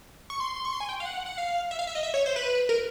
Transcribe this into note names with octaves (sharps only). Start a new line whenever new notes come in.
C#6
C6
C#6
C6
G#5
G5
F5
F#5
F#5
F5
E5
F5
E5
D#5
E5
C#5
C5
B4
A#4